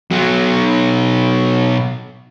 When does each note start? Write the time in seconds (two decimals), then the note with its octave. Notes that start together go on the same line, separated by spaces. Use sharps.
0.11 B2 F#3